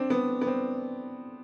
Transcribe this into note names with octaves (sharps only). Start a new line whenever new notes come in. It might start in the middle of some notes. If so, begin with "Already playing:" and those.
Already playing: C4 D4
B3
B3
C4